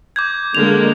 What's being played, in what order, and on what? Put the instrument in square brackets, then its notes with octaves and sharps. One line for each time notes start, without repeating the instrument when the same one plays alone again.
[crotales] D6 G6 G#6
[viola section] D3 G#3 A#3 [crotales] F7